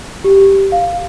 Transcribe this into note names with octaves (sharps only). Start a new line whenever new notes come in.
G4
F5